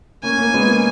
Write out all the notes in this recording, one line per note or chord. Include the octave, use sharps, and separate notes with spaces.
A#3 C#4 G#5
A#3 C#4
G#3 B3
A#3 C#4